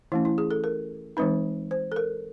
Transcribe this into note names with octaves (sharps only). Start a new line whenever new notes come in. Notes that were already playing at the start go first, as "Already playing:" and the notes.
E3 A3 C#4 E4
E4
G#4
A4
A#4
E3 G#3 C4 D#4 B4
C5
A4
A#4